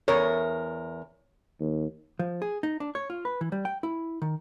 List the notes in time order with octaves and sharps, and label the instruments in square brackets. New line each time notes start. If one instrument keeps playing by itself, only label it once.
[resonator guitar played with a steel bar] E2 A#4 [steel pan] C#5
[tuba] D#2
[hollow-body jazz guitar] F3
G#4
D#4
D4
C#5
F4
B4
E3
G3
G5
E4
D#3